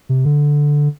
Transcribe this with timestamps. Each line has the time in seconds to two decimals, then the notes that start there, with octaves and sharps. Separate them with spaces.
0.09 C3
0.25 D3